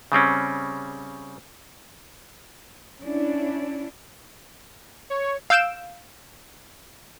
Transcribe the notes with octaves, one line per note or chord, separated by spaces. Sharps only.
C#3 G3 C4 C#4
C#4 D4 E4
C#5
F5 E6 G6 D7 E7